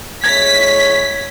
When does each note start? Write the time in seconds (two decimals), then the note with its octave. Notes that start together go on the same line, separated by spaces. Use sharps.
0.24 G#3 E4 C#5 G#6 B6